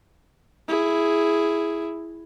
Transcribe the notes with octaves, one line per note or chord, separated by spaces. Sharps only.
E4 G#4